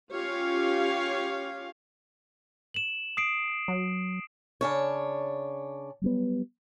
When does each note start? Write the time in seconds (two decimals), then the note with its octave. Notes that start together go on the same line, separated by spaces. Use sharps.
0.14 C#4 F4 G4 C#5 F5
2.74 E7 F#7
3.17 D#6 C7 D7
3.68 F#3
4.61 C#3 D4 C#5
6.01 F#3 G3 B3